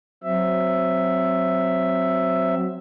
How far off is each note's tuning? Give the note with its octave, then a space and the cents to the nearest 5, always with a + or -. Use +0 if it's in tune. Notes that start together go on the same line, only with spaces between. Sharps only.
F#3 +0 C4 +0 E5 +5